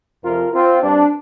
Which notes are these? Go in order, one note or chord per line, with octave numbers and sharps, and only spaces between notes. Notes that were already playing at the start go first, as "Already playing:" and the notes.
F2 C3 F3 C4 F4 A#4
C4 F4
G2 G3 C4 D4